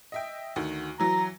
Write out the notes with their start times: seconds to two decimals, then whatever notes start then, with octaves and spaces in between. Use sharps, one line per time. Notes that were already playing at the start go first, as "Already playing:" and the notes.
0.12 D#5 E5 G5
0.56 D2 D#3 F#4
1.00 E3 F#3 A#5